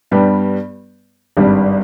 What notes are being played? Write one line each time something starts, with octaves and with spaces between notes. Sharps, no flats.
G2 G3 B3 G4
G#1 G2 G3